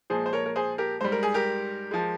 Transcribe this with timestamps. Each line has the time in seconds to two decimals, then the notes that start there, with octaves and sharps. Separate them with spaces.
0.10 A#2 F3 G#3 G#4 C5
0.26 C5
0.33 A#4 C#5
0.46 A#4
0.56 G#4 C5
0.78 G4 A#4
1.01 G#2 G3 C5
1.12 A#4
1.23 G#4
1.34 G4 A#4
1.91 F3 G#3